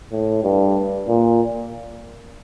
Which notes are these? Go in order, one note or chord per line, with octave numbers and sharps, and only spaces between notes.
A2
G2
A#2